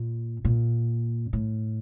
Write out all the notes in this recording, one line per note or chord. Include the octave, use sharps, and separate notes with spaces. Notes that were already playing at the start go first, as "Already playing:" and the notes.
Already playing: A#2
A#2
A2